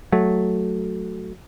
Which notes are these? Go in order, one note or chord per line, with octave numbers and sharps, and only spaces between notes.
F#3 A3